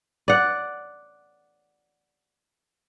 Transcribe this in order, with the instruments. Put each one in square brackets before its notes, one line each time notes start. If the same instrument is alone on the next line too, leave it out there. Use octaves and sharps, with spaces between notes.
[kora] D5 F#5